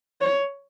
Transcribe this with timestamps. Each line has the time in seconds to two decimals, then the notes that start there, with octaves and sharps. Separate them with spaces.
0.21 C#5